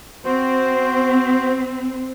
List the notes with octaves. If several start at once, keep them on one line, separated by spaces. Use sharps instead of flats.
C4 F#4 C5